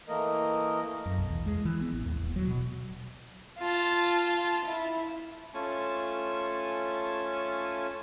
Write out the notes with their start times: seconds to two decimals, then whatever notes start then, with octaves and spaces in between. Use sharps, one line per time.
0.09 E3 A3 A#3 A#4 D#5
1.06 F#2
1.18 B1
1.30 E2
1.46 G#3
1.65 E3
1.81 B3
1.93 A1
2.05 D#2
2.21 D#1
2.36 F#3
2.47 B2
3.59 F4 A5
4.64 E4
5.54 A3 C#4 F4 G#5 A5 C#6